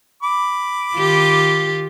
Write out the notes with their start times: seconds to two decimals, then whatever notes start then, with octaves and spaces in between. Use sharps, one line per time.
0.23 B5 D6
0.94 D#3 F4 G4